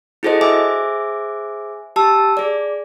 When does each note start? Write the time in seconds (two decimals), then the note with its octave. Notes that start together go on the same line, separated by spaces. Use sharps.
0.23 E4 F#4 G#4 A4 C5 D#5
0.41 G#4 C5 E5 G#5 D6
1.96 G4 A5 E6
2.37 G#4 D5